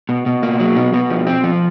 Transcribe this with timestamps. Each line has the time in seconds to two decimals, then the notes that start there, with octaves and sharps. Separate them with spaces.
0.09 B2
0.26 B2
0.43 A#3
0.60 F#3
0.76 B2
0.94 B2
1.10 F3
1.27 C4
1.44 F3